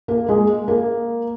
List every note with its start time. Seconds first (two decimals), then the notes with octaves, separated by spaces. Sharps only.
0.08 A#3
0.29 G#3
0.68 A#3